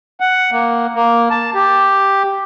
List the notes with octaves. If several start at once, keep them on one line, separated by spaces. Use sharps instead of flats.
F#5
A#3
A#3
A5
G4